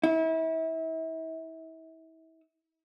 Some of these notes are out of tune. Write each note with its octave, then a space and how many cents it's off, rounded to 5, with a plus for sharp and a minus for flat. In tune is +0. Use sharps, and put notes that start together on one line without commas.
E4 -35